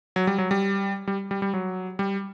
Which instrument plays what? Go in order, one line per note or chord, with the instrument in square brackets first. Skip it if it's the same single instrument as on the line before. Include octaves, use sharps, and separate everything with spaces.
[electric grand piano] F#3
G3
F#3
G3
G3
G3
G3
F#3
G3